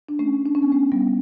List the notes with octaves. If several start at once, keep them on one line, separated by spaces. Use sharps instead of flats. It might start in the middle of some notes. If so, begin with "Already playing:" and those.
D4
A3 C#4
D4
C#4
B3 D4
A3 C#4
G3 B3